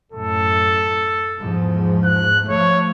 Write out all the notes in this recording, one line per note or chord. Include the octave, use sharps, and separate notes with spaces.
F#2 A2 A4
E2 G#2 F3
F#6
F3 A3 C#5